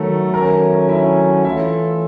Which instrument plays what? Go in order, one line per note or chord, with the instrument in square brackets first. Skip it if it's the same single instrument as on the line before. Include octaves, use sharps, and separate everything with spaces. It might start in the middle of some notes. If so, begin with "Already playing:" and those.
Already playing: [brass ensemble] D#3 F#3 A3 [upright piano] A4 A#5
[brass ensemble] D#3 F#3 A3 C#4 [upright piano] A#4 A#5
[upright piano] E4 E5
[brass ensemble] E3 A3 C#4 F4 A4 [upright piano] E4 E5